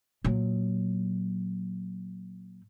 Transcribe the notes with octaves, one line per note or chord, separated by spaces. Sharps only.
A#2 F#3